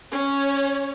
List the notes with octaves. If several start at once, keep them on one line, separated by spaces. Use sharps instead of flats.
C#4 C#5